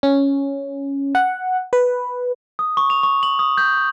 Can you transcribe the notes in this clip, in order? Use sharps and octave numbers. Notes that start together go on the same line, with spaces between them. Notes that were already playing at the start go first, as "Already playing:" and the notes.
C#4
F#5
B4
D#6
C#6
F7
C#6
F#7
D#6
G6